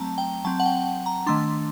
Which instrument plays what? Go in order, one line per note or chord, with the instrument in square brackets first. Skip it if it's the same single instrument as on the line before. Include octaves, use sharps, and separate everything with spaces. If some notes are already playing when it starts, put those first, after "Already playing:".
Already playing: [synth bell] F#3 A3 C4 A5 A#5
G5
F#3 C4 A5
F#5
G5
A#5
D#3 A3 D4 C6